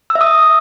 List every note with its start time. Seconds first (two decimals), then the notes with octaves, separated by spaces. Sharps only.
0.10 E6
0.15 E5
0.21 D#6